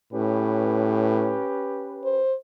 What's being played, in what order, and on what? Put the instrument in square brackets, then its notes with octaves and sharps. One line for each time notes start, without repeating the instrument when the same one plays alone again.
[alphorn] A2 [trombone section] C#4 G4 B4
[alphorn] C5